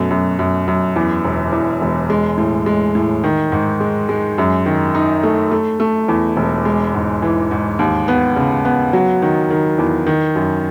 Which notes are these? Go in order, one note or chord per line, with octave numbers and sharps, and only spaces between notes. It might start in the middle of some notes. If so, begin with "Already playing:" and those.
Already playing: F#2 B2 A3
F#2
F#2
F#2
E2
E1
E2
E1
G#3
A2
G#3
A2
D#3
G#2
G#3
G#3
F#2
D#3
D#4
A3
A3
A3
E2
E1
G#3
G#2
E3
G#2
D#2
B3
C#3
B3
F#3
D#3
D#3
E2
D#3
F#2